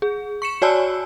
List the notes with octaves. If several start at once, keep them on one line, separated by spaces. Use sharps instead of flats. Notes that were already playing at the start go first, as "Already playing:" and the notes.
G#4
C#6 C#7 E7
F#4 C#5 D5 G#5 A5 E6